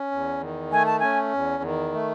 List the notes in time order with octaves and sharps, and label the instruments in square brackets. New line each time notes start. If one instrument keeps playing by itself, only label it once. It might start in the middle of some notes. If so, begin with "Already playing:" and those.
Already playing: [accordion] C#4
E2
D#3
[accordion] A3 [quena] G#5
[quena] A5
[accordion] C#4 [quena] G#5
[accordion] E2
D#3
A3